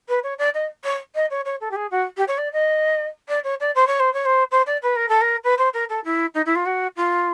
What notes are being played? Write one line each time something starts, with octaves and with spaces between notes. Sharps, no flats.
B4
C#5
D5
D#5
C#5
D#5
C#5
C#5
A4
G4
G#4
F#4
G4
C#5
D5
D#5
D5
C#5
D5
C5
C#5
C5
C#5
C5
C5
D5
B4
A#4
A4
A#4
B4
C5
A#4
A4
E4
D#4
E4
F4
F#4
F4